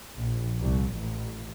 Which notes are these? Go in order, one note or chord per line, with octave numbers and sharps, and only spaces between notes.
A#1
C2
A1